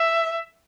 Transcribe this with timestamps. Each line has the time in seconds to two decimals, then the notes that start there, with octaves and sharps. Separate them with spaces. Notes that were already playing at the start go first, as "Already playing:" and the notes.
Already playing: E5